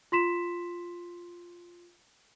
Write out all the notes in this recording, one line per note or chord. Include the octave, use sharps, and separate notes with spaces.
F4 C6 B6 E7